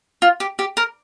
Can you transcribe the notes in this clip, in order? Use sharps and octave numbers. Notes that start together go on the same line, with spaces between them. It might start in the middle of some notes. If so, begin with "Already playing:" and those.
F4
G4
G4
A#4